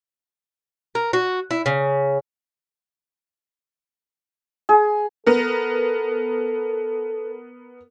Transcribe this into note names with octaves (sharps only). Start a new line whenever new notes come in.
A#4
F#4
E4
C#3
G#4
B3 A4 A#4